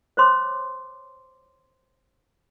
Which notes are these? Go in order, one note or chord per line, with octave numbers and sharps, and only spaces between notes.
C5 C#5 C6 D6